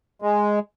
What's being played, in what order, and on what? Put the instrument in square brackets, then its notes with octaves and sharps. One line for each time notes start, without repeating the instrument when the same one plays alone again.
[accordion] G#3